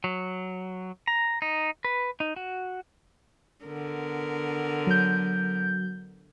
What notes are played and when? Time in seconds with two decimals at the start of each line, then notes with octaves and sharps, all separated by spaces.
0.04 F#3
1.07 A#5
1.42 D#4
1.85 B4
2.20 D#4
2.36 F#4
3.65 D3 B3 A#4
4.87 F#3 G6